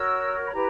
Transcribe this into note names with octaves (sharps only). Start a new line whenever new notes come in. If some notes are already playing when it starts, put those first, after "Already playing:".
Already playing: F#4 A#4 C#5 E6
B5
E4 G4 B4 A#5